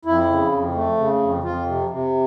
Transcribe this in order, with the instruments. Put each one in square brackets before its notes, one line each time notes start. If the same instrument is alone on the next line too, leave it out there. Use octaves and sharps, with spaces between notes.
[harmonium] F2 E4
C#3
F2
A3
C#3
F2
F2 F4
C3
C3